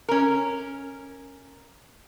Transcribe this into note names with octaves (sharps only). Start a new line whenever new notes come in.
C#4 A#4